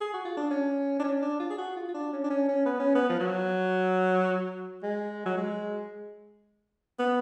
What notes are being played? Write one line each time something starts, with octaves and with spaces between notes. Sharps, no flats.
G#4
F#4
F4
D4
C#4
D4
C#4
D4
F4
G#4
F#4
F4
F4
D4
C#4
D4
C#4
C#4
B3
C#4
B3
F3
F#3
G#3
F#3
G#3
B3